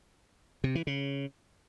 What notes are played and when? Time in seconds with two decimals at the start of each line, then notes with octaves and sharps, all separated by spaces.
0.64 C3
0.75 E3
0.87 C#3